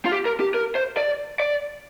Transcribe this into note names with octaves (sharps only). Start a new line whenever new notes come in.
F4
G4
A#4
G4
A#4
C5
D5
D5